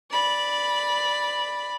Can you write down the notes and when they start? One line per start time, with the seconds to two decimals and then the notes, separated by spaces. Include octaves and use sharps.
0.11 D5 B5